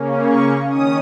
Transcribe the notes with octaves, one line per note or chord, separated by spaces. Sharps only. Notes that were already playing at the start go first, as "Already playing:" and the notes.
Already playing: C#3 A#3 C#4
C#6
D#3 C#4 D#6